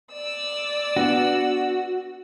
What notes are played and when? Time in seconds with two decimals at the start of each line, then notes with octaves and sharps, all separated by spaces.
0.13 D5 E6
0.96 B3 D4 F#4